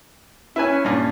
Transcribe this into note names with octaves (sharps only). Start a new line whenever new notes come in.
C#4 E4 B4 G#5
G2 A#2